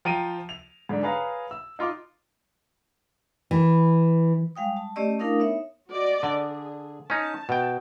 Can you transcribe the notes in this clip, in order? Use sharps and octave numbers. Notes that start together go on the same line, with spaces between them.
F3 G5 A#5 D7 D#7
F7
G#2 D3 D4
G#4 B4 C#5 F5 A#5
E6
D#4 F4 C6 D6
E3
G3 G#3 F5 G5 D#6
A5
A3 C#4 G4 D5 D#5 E6
A3 D4 E4 A#4 F5 D#6
B3 D#4 C#5 E5
F#4 D5 D#5
D3 G#4
C#4 D#4 A5
B2 G5